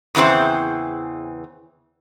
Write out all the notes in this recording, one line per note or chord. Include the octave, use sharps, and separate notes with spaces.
E2 C#3 E3 C4 C5